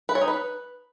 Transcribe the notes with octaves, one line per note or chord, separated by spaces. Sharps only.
B4
C#5
D#4
B4